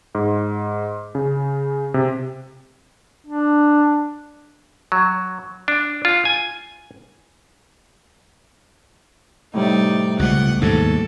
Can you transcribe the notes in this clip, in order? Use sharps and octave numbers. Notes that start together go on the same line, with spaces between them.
G#2
C#3
C3
D4
F#3
D4
F4
G#5
A2 C3 G3 D#4 D5
C#2 B2 F#5
D#2 G#2 B2 A4